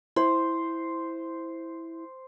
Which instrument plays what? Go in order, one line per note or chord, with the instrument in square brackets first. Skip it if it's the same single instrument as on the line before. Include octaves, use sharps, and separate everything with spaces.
[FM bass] E4 [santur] C5